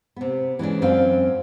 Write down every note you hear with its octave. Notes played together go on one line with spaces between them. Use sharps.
C3 B3
E3 G#3 C#4 D4
F#2 C4 F5